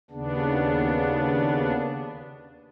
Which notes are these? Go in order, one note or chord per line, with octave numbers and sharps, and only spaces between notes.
D#2 C#3 B3 D4